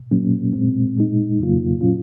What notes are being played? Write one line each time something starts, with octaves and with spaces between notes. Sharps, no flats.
A#2 F#3 A#3 C#4
A#2 G#3 C4
A#2 G#3 D#4
F2 C#3 F#3 A#3 F4
A#2 F#3 C#4 F4